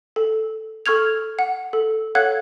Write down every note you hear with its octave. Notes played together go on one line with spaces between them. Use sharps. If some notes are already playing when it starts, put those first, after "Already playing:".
A4
A4 C#6 F6 G#6 F7
F#5
A4
A4 C#5 F5 F#5 F#6 G#6